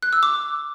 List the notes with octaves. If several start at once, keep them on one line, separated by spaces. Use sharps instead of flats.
F#6
E6
D6